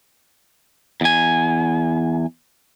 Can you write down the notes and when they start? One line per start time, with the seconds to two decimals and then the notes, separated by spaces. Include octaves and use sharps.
1.01 E2 G#5